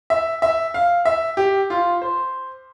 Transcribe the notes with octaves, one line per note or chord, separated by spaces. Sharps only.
E5
E5
F5
E5
G4
F4
C5